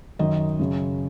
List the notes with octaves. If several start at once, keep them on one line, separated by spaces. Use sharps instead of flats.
F#2 D#3 D#5
F#2 C#3